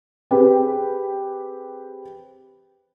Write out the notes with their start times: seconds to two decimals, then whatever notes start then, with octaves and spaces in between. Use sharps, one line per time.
0.31 C4 G4 G#4 B4 G5